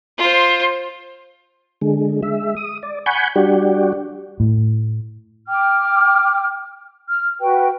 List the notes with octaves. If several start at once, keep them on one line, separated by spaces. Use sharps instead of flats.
F4 C5
D3 G#3
G#3 E5
D#6
D5
F#5 G#5 B5 C#6 G6
G3 D4 F#4 G4
A2
G5 D6 F6
F6
F#4 B4 G5